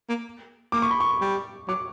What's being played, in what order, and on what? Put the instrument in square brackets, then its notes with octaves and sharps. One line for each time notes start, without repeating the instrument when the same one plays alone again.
[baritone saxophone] A#3
[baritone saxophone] A#3 [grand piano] D6
[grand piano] C#6
B5
C#6
[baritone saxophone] G3
[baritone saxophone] F#3 [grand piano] D6